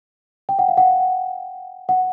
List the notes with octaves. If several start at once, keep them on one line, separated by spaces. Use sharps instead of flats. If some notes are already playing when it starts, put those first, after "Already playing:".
G5
F#5
F5
F#5
F#5